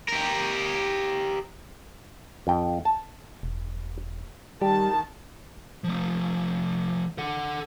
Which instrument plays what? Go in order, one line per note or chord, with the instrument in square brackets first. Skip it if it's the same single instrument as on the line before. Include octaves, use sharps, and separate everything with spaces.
[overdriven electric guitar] G4 A#4
[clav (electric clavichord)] F2 G5
A5
[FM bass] E1
[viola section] D#3 A5 [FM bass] G3 [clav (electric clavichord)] G4
[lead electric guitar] F3 A3
A4 F#5